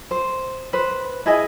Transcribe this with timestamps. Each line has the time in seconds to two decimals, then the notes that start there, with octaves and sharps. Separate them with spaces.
0.11 C5
0.73 B4 C5
1.26 E4 G#4 D#5 G#5